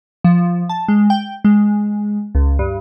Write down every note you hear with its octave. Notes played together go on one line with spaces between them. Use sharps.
F3
A5
G#3
G5
G#3
C#2
G2